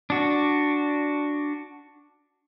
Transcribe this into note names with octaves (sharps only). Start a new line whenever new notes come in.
D4 F#4